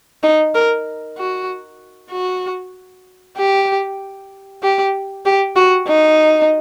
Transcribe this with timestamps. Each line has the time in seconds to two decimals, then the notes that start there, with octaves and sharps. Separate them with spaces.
0.23 D#4
0.55 A#4
1.18 F#4
2.11 F#4
3.37 G4
4.63 G4
5.25 G4
5.56 F#4
5.88 D#4